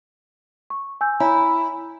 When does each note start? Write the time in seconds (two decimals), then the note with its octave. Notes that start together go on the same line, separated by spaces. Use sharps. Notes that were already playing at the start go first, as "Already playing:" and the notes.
0.70 C#6
1.01 G#5 E6 G6
1.20 E4 C#5 G#5 A#5